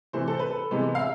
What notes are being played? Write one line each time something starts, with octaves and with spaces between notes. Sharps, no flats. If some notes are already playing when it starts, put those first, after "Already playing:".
C3 E3 A3 C5
A4
B4
A4
C3 E3 G#3 B3
F5
E5